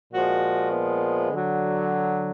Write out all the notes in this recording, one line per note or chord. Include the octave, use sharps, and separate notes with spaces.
A#2 F3 G#3 F#4
B3
D3 F#3